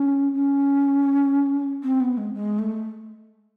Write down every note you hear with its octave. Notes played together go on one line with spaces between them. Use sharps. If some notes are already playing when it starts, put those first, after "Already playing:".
Already playing: C#4
C#4
C4
B3
G#3
G#3
A3